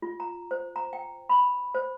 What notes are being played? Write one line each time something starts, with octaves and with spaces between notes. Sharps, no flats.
F4
A#5
C5
A#5
G5
B5
C5